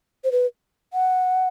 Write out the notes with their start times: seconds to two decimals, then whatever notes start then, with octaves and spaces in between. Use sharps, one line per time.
0.24 C5
0.32 B4
0.93 F#5